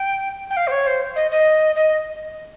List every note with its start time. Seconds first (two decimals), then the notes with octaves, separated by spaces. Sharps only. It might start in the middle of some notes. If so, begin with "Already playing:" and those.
Already playing: G5
0.50 G5
0.57 F5
0.67 C5
0.71 C#5
0.87 C5
1.16 D#5
1.31 D#5
1.76 D#5